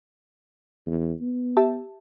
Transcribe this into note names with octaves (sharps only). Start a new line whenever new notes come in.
E2
B3
G4 E5 A5